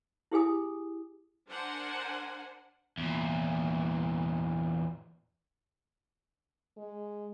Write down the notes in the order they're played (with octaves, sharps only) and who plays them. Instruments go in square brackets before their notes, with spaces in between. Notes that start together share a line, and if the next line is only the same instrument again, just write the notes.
[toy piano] E4 G4 G#4 G#5 D#6
[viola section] D4 A#4 C5 F#5 G#5
[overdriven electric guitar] E2 A#2
[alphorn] G#3